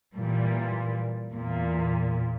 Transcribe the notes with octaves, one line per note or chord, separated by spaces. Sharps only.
A#2 E3 G3
E2 A#2